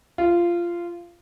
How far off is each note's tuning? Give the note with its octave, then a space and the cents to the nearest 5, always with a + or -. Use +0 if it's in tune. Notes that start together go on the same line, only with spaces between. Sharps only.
F4 -15